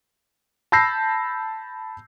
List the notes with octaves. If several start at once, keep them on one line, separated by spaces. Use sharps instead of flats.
A5 B5 E6 G6 A#6 C7